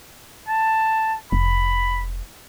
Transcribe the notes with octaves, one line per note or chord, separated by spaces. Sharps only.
A5
F1 B5